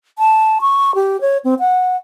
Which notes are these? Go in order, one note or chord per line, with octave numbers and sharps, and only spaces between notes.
A5
C#6
G4
C#5
C4
F#5